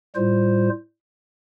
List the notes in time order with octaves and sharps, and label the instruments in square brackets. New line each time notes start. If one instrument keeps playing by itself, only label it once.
[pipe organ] A2 G3 F4 C5